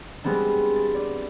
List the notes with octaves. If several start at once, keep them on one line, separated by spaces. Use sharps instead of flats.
G3 G#3 B3 C4 D4
A6
D5